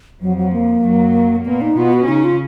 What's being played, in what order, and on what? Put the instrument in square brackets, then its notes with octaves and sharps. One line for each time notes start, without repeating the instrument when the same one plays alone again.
[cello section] F2 F3 [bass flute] F#3
[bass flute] F#3
A#3
[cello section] F#2 F#3
[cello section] A#2 A#3 [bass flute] B3
[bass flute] D#4
[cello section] B2 B3 [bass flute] F4
[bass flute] F#4
[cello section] C#3 C#4 [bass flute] D#4
[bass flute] F4